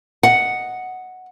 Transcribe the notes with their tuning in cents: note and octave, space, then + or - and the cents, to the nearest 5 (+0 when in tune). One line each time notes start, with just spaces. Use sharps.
D#5 +0 F#5 +0